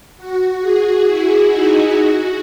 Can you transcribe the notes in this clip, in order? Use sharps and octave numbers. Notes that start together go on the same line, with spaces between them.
F#4
G#4
E4
D#4
F#4